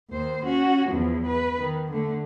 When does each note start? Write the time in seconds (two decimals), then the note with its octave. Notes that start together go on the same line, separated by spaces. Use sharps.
0.10 D#2 C5
0.45 C#4 F#4
0.90 E2 F3
1.26 B4
1.59 D#3
1.91 D3 A3